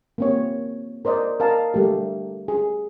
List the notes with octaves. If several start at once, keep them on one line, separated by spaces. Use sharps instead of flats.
A#3 C4 C#5
A#4 C5 D5 D#5
A#4 D#5 F5 A5
G3 A3 G4
G#4